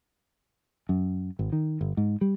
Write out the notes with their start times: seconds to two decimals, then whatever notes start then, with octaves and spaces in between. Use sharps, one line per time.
0.89 F#2
1.39 G#1
1.52 D#3
1.81 G1
1.97 G#2
2.21 G3